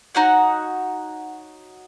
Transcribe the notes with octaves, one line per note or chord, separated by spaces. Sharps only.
D#4 F#4 C#5 F#5